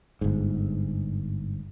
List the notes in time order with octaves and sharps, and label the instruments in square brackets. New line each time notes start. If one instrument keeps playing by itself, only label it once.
[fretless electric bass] G1 G#2